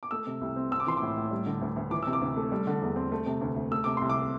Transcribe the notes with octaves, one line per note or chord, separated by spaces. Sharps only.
D6
A3 E6
C3
C2
C4
C4 E6
D6
E3 C6
A2 D6
A2
G3
D3
D2
D2
E3 D6
C3 E6
D6
D2
A3
G3
D3
E2
C4
A3
C3
D2
D2
A3 E6
C3 D6
C2 C6
D6